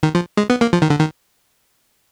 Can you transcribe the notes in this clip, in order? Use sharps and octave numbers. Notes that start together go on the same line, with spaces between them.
D#3
F3
G#3
B3
A#3
F3
D#3
D3
D#3